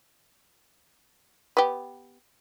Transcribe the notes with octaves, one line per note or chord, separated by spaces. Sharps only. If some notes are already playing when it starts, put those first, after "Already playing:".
B3 G4